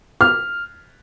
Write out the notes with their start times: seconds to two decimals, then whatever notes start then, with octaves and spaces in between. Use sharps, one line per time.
0.21 F6